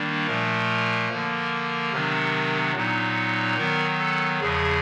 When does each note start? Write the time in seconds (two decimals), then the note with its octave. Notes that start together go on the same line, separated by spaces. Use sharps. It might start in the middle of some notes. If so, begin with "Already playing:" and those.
Already playing: D#3 G3 A#3 D4
0.27 A#2 F3 A3 A#4
1.10 D3 F3 A#3
1.92 C3 D#3 F#3 B3 D4
2.75 A#2 F#3 B3 D#4
3.58 D#3 F#3 B3 A#4
3.99 A4
4.40 E2 C#3 F3 G#4